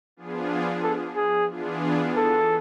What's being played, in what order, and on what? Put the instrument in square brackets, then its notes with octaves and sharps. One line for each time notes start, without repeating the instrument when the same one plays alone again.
[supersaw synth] F3 B3 D4 F4 G#4
[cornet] A4
G#4
[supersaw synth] E3 B3 D4 F4 G#4
[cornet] A4